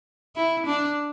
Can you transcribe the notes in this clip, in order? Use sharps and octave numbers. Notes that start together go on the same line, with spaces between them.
E4
D4